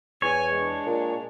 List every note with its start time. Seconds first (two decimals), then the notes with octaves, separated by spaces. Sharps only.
0.22 E2 C#5 G#5
0.53 G#3 D4
0.86 A#2